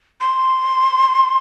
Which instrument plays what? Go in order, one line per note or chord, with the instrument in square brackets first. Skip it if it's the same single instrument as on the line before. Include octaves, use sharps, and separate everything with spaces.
[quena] C6